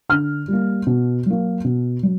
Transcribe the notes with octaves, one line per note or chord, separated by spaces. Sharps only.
D3 F6
G3 A#3
B2
F#3 A#3
B2
F#3